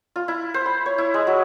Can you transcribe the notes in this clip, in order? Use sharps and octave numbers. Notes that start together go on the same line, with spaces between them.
F4
E4
C5
B5
C#5
E4
G#3
F#3